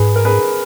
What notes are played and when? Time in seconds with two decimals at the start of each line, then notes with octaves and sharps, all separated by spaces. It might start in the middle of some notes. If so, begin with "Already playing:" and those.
Already playing: G#2 G#4 B4
0.16 A#4
0.25 G#4 B4